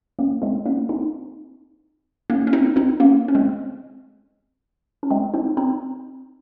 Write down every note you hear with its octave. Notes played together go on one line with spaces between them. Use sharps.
A#3 C#4
G#3 C4
A#3 C#4
C4 D#4
A#3 C#4
C#4
C4 D#4
C4 D#4
A#3 C#4
C#4
G#3 C4
C#4
G#3 C4
C4 D#4
C4 D#4